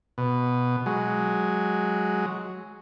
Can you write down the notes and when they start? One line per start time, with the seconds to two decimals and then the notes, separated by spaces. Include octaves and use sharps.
0.18 B2
0.86 F#3 G#3